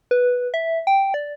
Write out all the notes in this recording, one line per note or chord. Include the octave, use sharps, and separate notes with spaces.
B4
E5
G5
D5